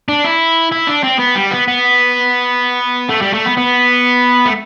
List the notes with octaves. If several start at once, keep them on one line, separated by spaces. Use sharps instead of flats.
D4
E4
E4
D4
C4
B3
G3
B3
B3
A3
G3
A3
B3
B3
A3